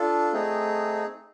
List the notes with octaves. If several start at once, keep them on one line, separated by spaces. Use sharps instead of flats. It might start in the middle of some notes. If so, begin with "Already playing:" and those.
Already playing: D4 F4 A4
A3 C4 D#4 G#4